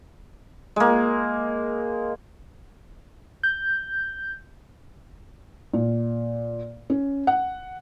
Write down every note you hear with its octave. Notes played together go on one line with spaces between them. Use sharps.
G#3 A#3
G6
A#2
C#4
F#5